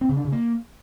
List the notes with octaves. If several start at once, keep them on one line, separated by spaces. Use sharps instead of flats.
C4
C#3
D4
C#3
A#3